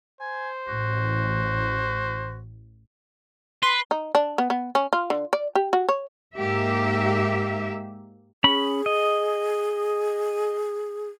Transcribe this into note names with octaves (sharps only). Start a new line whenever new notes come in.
C5 G#5
A1 F#4
B4 C6
D#4
D4
B3
B3
C#4
F4
D3
D5
G4
F#4
C#5
G#2 A#3 G4 E5
C#4 G#4 B5
D#5